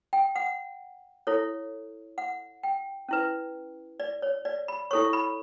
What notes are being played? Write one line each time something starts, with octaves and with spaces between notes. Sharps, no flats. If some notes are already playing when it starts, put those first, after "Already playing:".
G5
F#5
E4 A4 C#5
F#5
G5
C#4 E4 B4
D5
C#5
D5
B5
E4 A4 C#5 C#6
B5